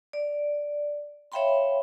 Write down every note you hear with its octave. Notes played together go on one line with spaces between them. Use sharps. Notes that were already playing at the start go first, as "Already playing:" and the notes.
D5
C#5 E5 F5 G5 B5 C6